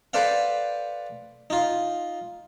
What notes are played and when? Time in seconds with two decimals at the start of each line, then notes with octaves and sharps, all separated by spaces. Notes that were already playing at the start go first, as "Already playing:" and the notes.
0.13 A4 B4 C5 D5 F5 F#5
1.50 D#4 F4